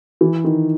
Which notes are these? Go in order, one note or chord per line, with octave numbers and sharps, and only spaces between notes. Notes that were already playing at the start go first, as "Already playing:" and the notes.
E3
D#3